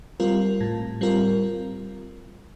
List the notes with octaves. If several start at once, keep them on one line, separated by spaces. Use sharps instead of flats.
G3 C4 F4 A#4
A2
G3 C4 F4 A#4